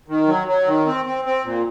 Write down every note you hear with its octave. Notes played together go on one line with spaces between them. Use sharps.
D#3
F#3
F#3
D#3
C4
C4
C4
A#2